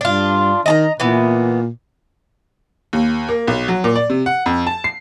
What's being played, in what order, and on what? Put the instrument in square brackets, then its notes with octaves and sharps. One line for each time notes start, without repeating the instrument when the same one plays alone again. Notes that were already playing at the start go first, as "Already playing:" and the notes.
[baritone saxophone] G2 [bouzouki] D4 F4
[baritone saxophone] D#3 [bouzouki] D#5 A5 A#5
[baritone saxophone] A#2 [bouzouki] E3 B3
[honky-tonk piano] D#2
A#3
B1
F#3
A#2
D5
C3
F#5
F2
A5
C7